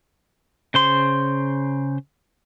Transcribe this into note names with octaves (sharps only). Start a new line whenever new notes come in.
C#3 C5 C6